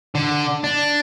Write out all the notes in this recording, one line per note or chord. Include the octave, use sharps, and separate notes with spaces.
D3
D4